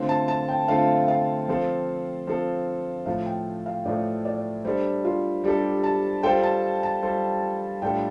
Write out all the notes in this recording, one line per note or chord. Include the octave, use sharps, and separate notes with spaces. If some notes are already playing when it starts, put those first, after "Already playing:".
Already playing: D3 A3 C4 F4
A5
A5
G5
D3 A3 C4 F4 F5
F5
F3 C4 A4
F3 C4 A4
A2 F3 A3 F5
G5
F5
A2 F3 A3 D5
D5
G3 D4 A4 C5
F4
G3 D4 G4 A4
A5
G3 F4 A4 C5 G5
A5
A5
G3 F4 A4 C5
A2 G3 D4 F4 A4 G5